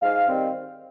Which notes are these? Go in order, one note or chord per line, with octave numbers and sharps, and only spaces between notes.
G#2 F5
D#3 G3 C4